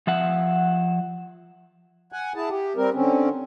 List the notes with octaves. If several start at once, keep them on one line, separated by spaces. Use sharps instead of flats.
F3 E5 F#5
F#5 G#5
E4 G#4 A5
G4
G3 C4 A#4
D3 C4 C#4